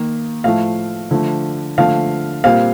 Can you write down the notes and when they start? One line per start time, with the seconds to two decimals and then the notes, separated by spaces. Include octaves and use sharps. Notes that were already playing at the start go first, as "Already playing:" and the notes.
Already playing: D#3 A#3
0.44 A2 F3 A3 F5
1.11 D3 F3 A3
1.78 D3 F3 A3 F5
2.44 A#2 G3 C4 F5